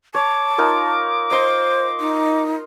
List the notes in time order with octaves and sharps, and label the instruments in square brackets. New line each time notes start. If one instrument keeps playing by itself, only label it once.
[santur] C#5 [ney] A5 [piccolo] D6
[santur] D#4 F4 A#4
[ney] C5 [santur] D#5 C6 C#6
[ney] D#4